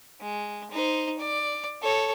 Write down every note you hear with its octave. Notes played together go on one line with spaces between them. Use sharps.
G#3
D#4 C5
D5
A4 C#5